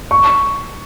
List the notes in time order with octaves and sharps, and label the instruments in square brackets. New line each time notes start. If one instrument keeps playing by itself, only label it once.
[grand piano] C#6